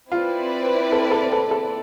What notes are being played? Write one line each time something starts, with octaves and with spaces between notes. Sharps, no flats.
C4 E4 F4 B4 D5
A4
A4
A4
A4